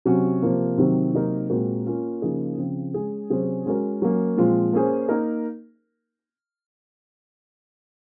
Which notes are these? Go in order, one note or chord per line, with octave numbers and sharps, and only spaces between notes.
C3 F#3 C#4 F#4
C3 F3 A#3
C3 D#3 F#3 C4
C3 F#3 A#3 D#4 A#4
A#2 G#3 C4 F#4 A#4
A#3 C#4 F4
C#3 F3 A#3 D#4 G#4
C#3 F3 C4
G#3 C#4 G#4
C3 F#3 C#4 G#4 C5
G#3 C#4 F#4 A#4
F#3 A#3 C#4
A#2 F3 G#3 C4 F4
A#3 C#4 G#4 C5
A#3 D#4 A#4